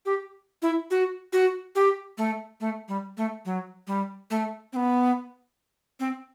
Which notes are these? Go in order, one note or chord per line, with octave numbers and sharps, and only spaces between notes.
G4
E4
F#4
F#4
G4
A3
A3
G3
A3
F#3
G3
A3
C4
B3
C4